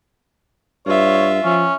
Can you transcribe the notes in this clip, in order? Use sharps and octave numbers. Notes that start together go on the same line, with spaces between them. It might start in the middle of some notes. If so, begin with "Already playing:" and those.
G2 F4 C#5 E5
F3 C#4